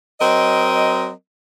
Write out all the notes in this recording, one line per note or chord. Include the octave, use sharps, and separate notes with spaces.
F#3 C4 A#4 D#5